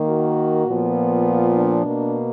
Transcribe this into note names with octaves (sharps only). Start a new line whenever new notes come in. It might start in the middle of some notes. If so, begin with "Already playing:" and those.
Already playing: D#3 A#3
F#4
A#2 F3 B3
F4
D4
B2 A#3